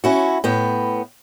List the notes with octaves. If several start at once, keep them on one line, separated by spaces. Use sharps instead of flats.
C#4 E4 F#4
A2 B3 G5